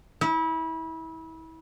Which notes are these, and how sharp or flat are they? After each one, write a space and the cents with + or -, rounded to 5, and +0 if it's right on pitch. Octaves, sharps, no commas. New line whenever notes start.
E4 -30